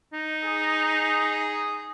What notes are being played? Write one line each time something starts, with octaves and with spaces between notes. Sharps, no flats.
D#4
G#4